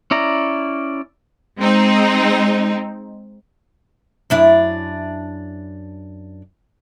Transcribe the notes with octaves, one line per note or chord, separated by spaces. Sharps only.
C#4 E4 D5 A#5
G#3 C4 D#4
F#2 D4 E4